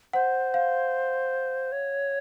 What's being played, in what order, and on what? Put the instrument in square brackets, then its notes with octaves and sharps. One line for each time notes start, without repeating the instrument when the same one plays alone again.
[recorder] C5 [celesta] F#5
[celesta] F5
[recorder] C#5